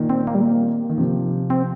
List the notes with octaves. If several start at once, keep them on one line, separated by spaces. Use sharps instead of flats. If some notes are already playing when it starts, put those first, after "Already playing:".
Already playing: A#2 D#3
C4
A#3
G3
A#3
D#3
C3 F3
C4